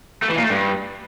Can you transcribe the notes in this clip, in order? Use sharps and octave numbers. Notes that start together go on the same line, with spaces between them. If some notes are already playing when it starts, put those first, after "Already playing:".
A3
E3
A#2
A3
G2